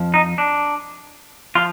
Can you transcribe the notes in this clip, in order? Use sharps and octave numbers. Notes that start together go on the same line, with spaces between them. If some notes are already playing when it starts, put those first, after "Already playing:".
Already playing: F2 F3
D#4
D4
F3 F4